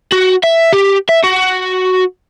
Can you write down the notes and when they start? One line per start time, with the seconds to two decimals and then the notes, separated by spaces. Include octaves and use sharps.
0.12 F#4
0.44 E5
0.73 G4
1.09 E5
1.24 F#4